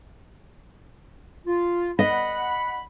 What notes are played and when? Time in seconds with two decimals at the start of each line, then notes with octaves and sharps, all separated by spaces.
1.46 F4
1.99 D#5 F#5 B5